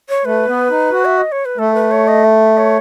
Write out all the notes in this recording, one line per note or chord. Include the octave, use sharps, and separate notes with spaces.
C#5
A3 B4
B3
D#4
F#4
E5
D#5
C#5
B4
A3 A4
B4
C#5
D#5
E5
C#5